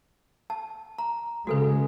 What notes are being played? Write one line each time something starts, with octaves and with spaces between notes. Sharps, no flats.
A5
A#5
C#3 G#3 F#4 A4 B4